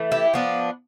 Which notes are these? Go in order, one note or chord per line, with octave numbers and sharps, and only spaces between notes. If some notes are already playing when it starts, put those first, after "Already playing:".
Already playing: E3 A3
E4 G4
F3 B3 D4